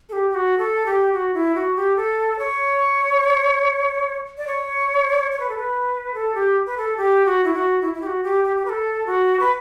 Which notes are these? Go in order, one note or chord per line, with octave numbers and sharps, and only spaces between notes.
A4
G4
G4
F#4
A4
G4
F#4
E4
F#4
G4
A4
C#5
D5
C#5
C#5
B4
A4
B4
A4
G4
B4
A4
G4
F#4
E4
F#4
E4
E4
G4
F#4
G4
G4
G4
B4
A4
F#4
B4